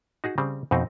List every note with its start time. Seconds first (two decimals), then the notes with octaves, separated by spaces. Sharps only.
0.24 D#4 F#4 G#4
0.38 C#3 G3 C4
0.71 F2 B2 C4 D#4